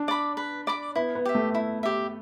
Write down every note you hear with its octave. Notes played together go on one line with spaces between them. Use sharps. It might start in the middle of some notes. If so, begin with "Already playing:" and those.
Already playing: D4
D5 B5 D6
B4
D5 B5 D6
B3 E4
B3
G4 E5
A3
E4
G4 E5